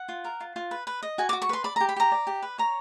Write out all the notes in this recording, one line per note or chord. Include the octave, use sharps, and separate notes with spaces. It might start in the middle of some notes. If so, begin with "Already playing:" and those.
Already playing: F#5
F4
A#4
F4
F4
B4
B4
D#5
F#4 G#5
D6
F#4
C#6
B4 C6
D5 B5
A#5
G4
B5
G4 A#5
D5
G4
B4
C#5 A#5